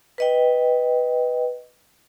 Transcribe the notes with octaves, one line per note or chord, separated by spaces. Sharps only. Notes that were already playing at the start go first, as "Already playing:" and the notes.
B4 D#5 G5